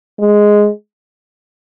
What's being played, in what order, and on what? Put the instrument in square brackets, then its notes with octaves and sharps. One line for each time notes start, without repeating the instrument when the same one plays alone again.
[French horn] G#3